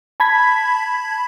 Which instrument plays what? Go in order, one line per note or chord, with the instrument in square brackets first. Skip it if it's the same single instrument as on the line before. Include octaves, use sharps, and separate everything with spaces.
[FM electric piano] A5 B5 G#6 B6